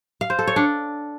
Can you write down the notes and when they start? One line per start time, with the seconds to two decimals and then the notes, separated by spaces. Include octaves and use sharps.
0.21 F5
0.30 C5
0.39 A4
0.47 C#5
0.56 D4